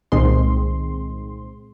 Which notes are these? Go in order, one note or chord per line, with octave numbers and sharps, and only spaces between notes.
C2 A#2 D#3 G#3 C4 C6